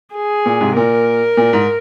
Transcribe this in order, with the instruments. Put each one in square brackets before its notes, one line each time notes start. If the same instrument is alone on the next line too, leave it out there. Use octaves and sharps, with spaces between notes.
[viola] G#4
[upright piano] A#2
G#2 C3
[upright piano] A#2 [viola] A#4
[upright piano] A#2
G#2